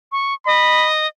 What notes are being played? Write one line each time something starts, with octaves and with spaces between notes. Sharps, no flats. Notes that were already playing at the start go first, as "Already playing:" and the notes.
C#6
D#5 B5